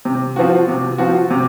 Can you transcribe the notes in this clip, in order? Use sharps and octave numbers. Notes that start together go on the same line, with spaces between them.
C3
F3 C4 F#4
C3
F3 C4 F#4
C3